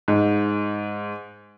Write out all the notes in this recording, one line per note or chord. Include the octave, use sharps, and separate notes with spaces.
G#2